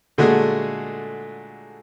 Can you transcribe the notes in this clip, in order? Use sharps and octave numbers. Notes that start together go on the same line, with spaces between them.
A#2 D3 G#3 A3 F#4 G#4